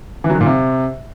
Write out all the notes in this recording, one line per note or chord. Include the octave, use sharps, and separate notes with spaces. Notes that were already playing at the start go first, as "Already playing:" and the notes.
E3
F#3
D#3
A#2
C3